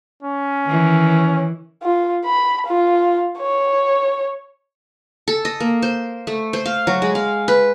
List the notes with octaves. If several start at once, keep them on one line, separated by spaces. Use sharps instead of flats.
C#4
D#3 E3
F4
B5
F4
C#5
A4
D#5
A#3
C5
A3
C5
F5
F#3
G#3
F5
B4